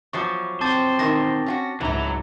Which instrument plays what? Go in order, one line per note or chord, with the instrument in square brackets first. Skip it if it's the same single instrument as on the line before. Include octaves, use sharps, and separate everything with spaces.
[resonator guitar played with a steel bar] E2 F3 F#3 [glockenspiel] C#6 D6
[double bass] C4 [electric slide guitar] C5 [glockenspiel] A5 D6 A6
[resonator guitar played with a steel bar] E2 B2 D#3 [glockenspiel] A#6
[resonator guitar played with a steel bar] C#4 F4 F#4
[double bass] C#2 G#2 [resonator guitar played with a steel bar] E3 E4 [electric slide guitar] F#3 A#5